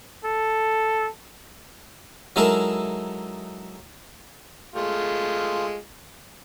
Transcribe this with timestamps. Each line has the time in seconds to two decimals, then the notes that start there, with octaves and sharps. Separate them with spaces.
0.25 A4
2.36 F#3 G#3 D#4 E4 A4 A#4
4.76 G#3 A3 F4